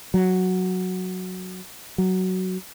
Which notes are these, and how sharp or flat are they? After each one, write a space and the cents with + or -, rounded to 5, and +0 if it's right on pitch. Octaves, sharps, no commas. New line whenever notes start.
F#3 -5
F#3 +10